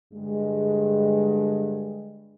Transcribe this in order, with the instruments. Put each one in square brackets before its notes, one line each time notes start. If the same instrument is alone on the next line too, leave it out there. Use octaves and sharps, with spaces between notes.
[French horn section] G2 D3 G#3